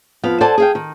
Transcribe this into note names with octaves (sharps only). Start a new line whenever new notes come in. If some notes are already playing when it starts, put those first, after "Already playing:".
F2 B3 F5
A4 C5 D5 F#5 G#5 A5
G#4 F5 G5
D#3